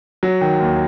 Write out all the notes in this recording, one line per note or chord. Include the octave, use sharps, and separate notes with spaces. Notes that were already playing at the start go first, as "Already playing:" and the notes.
F#3
D#3
D#2